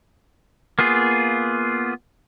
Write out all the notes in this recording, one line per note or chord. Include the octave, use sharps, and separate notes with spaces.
A#3 B3 F4 G#4